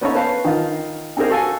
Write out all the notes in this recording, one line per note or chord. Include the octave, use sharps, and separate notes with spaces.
B3 C#4 D#4 A4 C#5
B4 C5 F5 A5
D#3 F4
C4 D#4 G4 G#4 A#4 C5
F#4 A4 F5 G#5